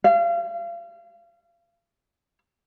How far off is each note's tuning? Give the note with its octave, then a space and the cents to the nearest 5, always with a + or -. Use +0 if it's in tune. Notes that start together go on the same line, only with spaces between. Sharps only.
F5 -35